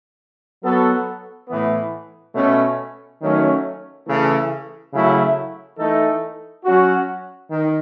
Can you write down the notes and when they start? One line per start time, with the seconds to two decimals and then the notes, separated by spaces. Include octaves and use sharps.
0.61 F#3 B3 F#4 A4
1.47 A2 E3 B3
2.34 B2 A3 C#4
3.20 D#3 F#3 A3 C#4
4.06 C#3 E3 A3 E4 A4
4.92 C#3 F#3 A3 C#4 E4
5.78 E3 A3 D#4 A4
6.64 F#3 C#4 F#4
7.49 D#3